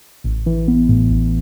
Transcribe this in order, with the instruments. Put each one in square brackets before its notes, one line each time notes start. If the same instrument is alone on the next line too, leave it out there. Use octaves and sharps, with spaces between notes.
[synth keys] A1
E3
B3
A2
A1